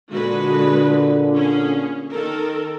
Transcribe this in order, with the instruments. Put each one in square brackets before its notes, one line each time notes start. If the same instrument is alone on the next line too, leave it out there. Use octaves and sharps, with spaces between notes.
[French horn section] A#2 D3 [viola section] G#3 F#4 B4
[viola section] C#4 G#4
D#3 A4 A#4